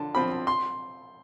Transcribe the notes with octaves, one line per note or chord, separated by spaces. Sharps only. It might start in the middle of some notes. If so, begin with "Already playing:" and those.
Already playing: D3 F4 A5
F3 C4 F4 B5
C6